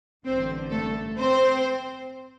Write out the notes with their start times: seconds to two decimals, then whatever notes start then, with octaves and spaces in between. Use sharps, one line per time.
0.24 A1 G2 D3 C4 C5
0.71 A3 A4
1.18 C4 C5